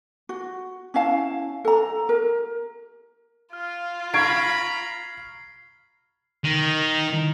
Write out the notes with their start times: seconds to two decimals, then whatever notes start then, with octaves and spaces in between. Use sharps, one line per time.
0.29 F#4
0.94 C#4 E4 F5 A5
1.65 A4 A#5
2.09 A#4
3.53 F4 F6
4.14 A#5 B5 C#6 G#6 C7 D7
6.44 D#3